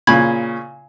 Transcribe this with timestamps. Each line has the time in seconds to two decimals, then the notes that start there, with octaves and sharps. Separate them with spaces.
0.07 A#2 C#3 B5 G#6